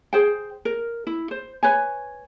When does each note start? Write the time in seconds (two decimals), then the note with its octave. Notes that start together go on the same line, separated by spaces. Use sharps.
0.13 G#4 C5 G5
0.65 A#4
1.07 E4
1.31 C5
1.63 B4 C#5 G#5